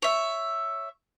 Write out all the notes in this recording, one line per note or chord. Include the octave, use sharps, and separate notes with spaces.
C#5 E5